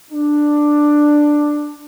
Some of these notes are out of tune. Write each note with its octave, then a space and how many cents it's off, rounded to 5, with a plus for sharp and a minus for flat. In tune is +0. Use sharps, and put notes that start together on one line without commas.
D4 +10